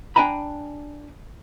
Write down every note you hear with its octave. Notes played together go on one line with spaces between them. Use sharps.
D4 G5 G#5 A#5 B5